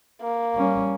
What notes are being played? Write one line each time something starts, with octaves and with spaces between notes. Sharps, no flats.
A#3
G3 C#4